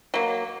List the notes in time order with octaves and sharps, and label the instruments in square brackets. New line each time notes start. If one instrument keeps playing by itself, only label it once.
[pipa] F#3 A#3